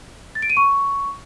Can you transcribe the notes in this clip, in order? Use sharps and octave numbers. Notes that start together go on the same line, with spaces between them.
A6
D7
D#7
C#6